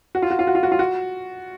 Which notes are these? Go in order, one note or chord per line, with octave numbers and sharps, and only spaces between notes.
F#4
F4
F#4
F4
F#4
F4
F#4
F4
F#4